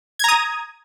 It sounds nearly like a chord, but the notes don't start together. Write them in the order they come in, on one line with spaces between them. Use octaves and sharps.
G#6 A#5 D#6